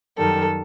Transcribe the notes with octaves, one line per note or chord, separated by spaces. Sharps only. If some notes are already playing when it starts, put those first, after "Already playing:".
F#2 D#3 G3 A4